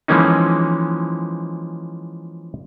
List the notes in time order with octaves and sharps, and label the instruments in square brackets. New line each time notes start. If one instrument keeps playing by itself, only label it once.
[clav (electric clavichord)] E3 F3 G#3 A#3 C#4 D#4